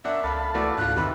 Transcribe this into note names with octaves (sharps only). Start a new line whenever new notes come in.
F#2 D4 E5 F#5
C#2 A4 F5 A5 B5
E3 A3 F#4 D5
G#2 C#3 F4 F#6
E2 C3 D#3 E3 E4 B5